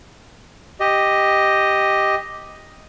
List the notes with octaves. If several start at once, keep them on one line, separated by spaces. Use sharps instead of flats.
G4 D#5